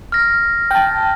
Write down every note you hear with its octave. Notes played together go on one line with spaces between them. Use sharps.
F6 A#6
G5 A5